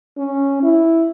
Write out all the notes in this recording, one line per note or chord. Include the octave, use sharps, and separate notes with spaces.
C#4
E4